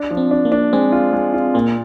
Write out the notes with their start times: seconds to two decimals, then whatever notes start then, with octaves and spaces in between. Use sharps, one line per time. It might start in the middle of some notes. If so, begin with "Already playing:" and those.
Already playing: D4
0.11 F3
0.17 C4
0.31 D4
0.45 A#3
0.52 D4
0.73 G#3 C4
0.92 F4
1.13 G#3
1.33 F4
1.54 A#2 A#3